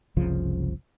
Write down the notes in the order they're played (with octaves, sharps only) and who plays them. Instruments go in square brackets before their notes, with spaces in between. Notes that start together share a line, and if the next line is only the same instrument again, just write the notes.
[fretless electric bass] F#1 C2 C#3 F3